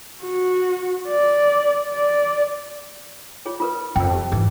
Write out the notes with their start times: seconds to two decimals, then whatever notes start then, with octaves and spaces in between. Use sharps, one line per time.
0.23 F#4
1.08 D5
1.94 D5
3.46 F4 G#4 C#5
3.60 F4 A#4 B4
3.96 F2 G5 E6
4.10 G4 A5
4.32 G#2 E3 G#4